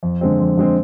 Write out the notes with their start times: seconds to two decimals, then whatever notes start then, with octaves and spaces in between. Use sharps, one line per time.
0.03 F2
0.21 D3 G#3 C4
0.39 F2
0.57 D3 G#3 C4